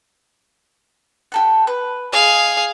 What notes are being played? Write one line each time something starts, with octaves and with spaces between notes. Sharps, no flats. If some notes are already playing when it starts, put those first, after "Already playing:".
G4 A4 F#5
B4
G#4 D#5 F5